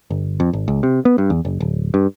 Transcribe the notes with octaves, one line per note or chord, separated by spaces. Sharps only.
G1
F2
G#1
C#2
C3
B3
G2
E2
F#1
D1
G2